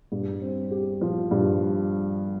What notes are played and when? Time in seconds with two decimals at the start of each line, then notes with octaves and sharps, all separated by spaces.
0.12 G2
0.42 C4
0.71 G4
1.01 F3
1.31 G2